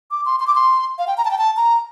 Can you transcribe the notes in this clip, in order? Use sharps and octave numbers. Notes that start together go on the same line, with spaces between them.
D6
C6
C6
D6
C6
F5
G5
A#5
A5
G5
A5
A#5